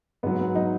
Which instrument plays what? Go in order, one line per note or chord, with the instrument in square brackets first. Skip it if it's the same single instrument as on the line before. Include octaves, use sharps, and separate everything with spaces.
[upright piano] G#2 F#3 B3
B3
F#3 D#4